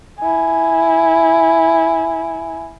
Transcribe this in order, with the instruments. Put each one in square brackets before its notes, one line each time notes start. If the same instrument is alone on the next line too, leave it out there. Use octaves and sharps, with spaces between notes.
[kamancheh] E4 G#5